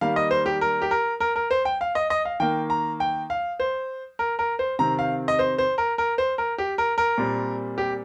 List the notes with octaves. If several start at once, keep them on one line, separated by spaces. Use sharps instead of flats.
D#3 G3 A#3 F5
D#5
C5
G4
A#4
G4
A#4
A#4
A#4
C5
G5
F5
D#5
D#5
F5
D#3 A#3 G5
A#5
G5
F5
C5
A#4
A#4
C5
C3 D#3 C4 A#5
F5
D#5
C5
C5
A#4
A#4
C5
A#4
G4
A#4
A#4
A#2 G3 C4
G4